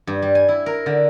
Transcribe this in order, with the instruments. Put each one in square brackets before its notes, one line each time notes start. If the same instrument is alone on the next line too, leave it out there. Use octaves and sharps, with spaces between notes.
[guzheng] G2
G3
G#5
E4
A#4
D3